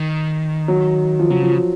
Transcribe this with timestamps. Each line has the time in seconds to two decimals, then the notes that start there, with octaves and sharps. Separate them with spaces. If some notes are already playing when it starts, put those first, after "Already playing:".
Already playing: D#3
0.68 F#3
1.19 F3
1.30 C#3 F#3
1.42 F3
1.52 F#3